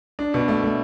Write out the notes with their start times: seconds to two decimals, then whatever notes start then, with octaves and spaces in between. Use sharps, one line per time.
0.19 D4
0.34 B2
0.48 A3
0.63 A3